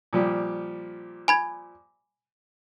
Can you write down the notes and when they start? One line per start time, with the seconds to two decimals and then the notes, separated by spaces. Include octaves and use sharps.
0.13 A#2 F3 G3
1.28 G#5 B5 G#6